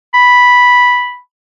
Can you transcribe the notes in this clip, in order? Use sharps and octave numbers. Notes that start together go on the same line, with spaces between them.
B5